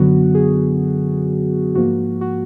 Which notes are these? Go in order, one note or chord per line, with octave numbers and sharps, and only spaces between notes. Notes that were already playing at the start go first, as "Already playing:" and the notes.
Already playing: F#2 D3 F#3 B3 F#4
G#4
G#2 F3 A#3 F#4
F#4